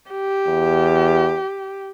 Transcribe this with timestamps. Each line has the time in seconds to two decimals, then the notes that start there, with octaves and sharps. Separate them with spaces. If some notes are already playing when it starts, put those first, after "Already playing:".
0.12 G4
0.48 E2